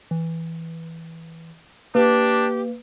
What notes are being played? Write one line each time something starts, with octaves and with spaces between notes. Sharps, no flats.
E3
A#3 D4 G4 B4